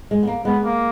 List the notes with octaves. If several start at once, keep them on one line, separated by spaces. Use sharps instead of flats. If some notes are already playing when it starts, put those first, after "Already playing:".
G#3
B3
A#3
G#3 B3
A#3